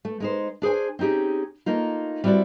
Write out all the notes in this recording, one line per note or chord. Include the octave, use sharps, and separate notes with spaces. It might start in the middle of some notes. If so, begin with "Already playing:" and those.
A3
G#3 D#4 C5
D4 G#4 C5 G#5
C4 C#4 D#4 G4 G#4
A3 A#3 D#4 F4
G3 C4 E4 F#4 D5